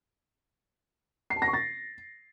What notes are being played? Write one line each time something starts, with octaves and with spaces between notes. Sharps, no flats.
C7
A5
A#6
C#6
A6